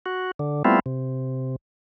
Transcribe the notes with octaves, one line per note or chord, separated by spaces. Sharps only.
F#4
D3
G3 A3 B3 C4 E4 F4
C3